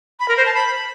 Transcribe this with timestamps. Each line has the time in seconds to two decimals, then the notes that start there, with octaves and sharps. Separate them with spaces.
0.20 B5
0.28 A#4
0.37 C5
0.46 A5
0.54 B5